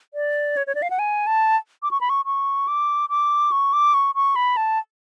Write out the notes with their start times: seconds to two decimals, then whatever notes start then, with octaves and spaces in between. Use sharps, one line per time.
0.14 D5
0.57 C#5
0.67 C#5
0.75 D5
0.82 F5
0.90 F#5
0.99 G#5
1.27 A5
1.83 D6
1.91 C#6
2.01 B5
2.10 C#6
2.25 C#6
2.68 D6
3.10 D6
3.52 C#6
3.73 D6
3.94 C#6
4.15 C#6
4.36 B5
4.57 A5